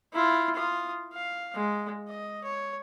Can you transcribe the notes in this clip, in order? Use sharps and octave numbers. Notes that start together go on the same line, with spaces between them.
E4 F4
F4 D#6
F5
G#3
D#5
C#5